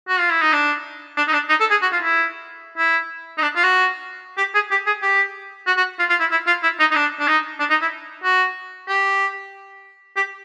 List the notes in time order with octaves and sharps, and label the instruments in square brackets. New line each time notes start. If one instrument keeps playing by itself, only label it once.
[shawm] F#4
F4
E4
D#4
D4
D4
D#4
D4
D#4
A4
G#4
F#4
F4
E4
E4
D#4
D4
F4
F#4
G4
G#4
G4
G#4
G4
F#4
F#4
F4
F4
E4
E4
F4
E4
D#4
D#4
D4
D4
D#4
D4
D#4
E4
F#4
G4
G4